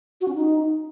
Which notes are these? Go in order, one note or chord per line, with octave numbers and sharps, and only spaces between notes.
F#4
C#4
D#4